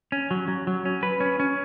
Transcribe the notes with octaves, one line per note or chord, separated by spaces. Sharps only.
C#4
F#3
F#3
F#3
C#4
B4
C#4
C#4